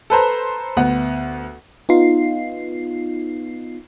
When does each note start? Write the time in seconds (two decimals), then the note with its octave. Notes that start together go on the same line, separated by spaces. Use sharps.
0.10 A4 B4 C5 A#5
0.77 D2 B3 F#5
1.89 B3 D#4 F4 C7